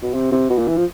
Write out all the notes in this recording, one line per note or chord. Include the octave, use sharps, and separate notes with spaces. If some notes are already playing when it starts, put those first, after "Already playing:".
B2
C3
C3
B2
A#2
E3
F3